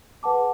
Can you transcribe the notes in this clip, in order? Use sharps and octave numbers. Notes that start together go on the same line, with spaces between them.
G#4 B4 F#5 A5 D6